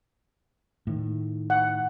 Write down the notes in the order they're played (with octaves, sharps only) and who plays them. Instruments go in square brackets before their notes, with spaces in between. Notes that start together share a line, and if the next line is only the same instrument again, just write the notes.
[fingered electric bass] A2 D#3
[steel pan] F#5